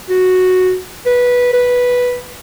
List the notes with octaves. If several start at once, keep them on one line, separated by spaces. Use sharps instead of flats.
F#4
B4
B4